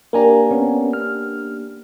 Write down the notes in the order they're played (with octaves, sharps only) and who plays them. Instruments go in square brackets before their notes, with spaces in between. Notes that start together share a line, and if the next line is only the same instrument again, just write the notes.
[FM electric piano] A#3 D4 G4 [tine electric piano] A#4 G#5 A#5
[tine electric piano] B3 C#4
F6